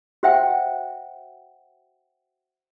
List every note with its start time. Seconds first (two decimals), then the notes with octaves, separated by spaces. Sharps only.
0.23 F#4 C5 E5 F#5 G5